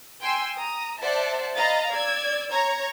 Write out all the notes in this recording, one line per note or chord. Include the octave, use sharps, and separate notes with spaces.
G5 G#5 C6 E6
A#5 D#6
C5 D5 E5 F#5 A5
D#5 F5 A#5 B5 A6
D5 E6 G#6
C#5 A#5 G#6